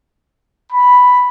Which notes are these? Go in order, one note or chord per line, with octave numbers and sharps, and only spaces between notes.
B5